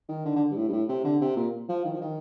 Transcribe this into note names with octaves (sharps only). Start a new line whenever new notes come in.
D#3
D3
D3
G2
A2
G2
A2
C3
D3
C3
A#2
F3
D#3
F3
D#3